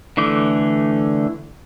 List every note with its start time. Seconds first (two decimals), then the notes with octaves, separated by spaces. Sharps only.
0.17 D3 E3 A3 D6